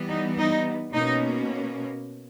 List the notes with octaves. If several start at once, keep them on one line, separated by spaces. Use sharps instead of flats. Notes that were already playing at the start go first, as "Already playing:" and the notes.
Already playing: E3 G3 B3
D#4
D#4
B2 A#3 C#4 D#4